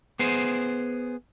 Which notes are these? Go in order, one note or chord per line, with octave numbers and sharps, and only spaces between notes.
B3 G#4 C5